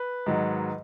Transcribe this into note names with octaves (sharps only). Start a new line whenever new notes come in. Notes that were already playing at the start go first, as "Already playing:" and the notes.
Already playing: B4
G#2 D#3 F#3